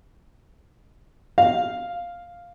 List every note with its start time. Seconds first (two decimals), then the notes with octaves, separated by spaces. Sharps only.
1.38 F5